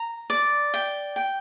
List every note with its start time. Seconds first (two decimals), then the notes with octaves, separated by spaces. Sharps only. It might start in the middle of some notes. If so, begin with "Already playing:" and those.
Already playing: A#5
0.30 D5
0.74 G5
1.16 G5